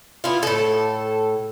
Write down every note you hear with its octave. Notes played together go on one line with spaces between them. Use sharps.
B3 E4 F4
A2 A4